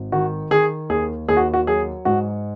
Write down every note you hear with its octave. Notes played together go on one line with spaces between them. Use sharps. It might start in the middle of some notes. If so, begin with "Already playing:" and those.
Already playing: G#1
D#3 F#4
D#3 G#4
D#2 G#4
D#2 G#4
F#4
F#4
F#3 G#4
G#2 F#4